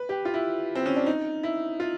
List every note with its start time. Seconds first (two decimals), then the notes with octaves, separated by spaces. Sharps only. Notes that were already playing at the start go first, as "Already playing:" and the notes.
Already playing: B4
0.09 G4
0.25 F4
0.34 E4
0.75 C4
0.86 C#4
0.96 D4
1.06 D#4
1.43 E4
1.80 F4